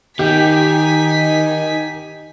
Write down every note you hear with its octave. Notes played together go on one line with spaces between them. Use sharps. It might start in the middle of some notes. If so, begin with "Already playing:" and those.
D#3 D#4 G4 G#5 B6